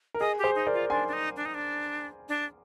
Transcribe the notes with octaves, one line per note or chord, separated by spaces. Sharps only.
A#4
G#4 D#5
G4
G#4 C5
D#4
A#4 D5
F4
D4 G#5 C6
D4
D#4
D4
D#4
D4
D4